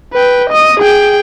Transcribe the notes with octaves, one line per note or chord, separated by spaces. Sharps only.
B4 G5
D#5 D#6
G#4 G5